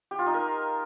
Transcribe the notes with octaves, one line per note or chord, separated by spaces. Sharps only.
G4
F4
D#4
A#4